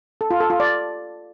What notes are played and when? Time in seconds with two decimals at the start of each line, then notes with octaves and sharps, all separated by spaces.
0.21 A4
0.31 F4
0.40 A4
0.50 F4
0.60 D5